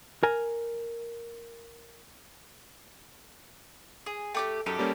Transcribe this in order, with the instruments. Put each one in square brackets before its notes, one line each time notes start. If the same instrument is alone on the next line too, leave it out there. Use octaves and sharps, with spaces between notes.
[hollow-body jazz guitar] A#4 G#5
[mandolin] G#4
[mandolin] A3 D4 G4 [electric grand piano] G5 D6
[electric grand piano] F#2 [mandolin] D#4 G4 A4
[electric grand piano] G3 A#3 C#4